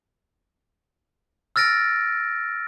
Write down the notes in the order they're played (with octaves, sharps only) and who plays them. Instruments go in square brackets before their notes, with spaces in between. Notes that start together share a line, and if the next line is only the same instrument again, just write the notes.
[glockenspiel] E6 F6 A6 A#6 D7